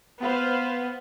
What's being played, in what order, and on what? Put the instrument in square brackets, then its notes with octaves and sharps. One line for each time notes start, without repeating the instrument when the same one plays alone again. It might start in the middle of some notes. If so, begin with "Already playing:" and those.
[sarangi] B3 [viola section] B4 C5 F5